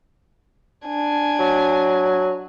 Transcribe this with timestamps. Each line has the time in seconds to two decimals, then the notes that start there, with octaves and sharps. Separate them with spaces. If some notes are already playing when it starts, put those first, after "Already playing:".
0.87 D4 G#5
1.39 F#3